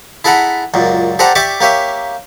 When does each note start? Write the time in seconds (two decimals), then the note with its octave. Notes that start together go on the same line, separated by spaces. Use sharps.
0.24 E4 G#4 A4 F#5 A#5 B5
0.74 C#2 F#2 A#2
1.19 G4 A4 C5 D5 F#5 A#5
1.35 G4 D5 E5 C#6 D6
1.61 A#3 G4 C#5 E5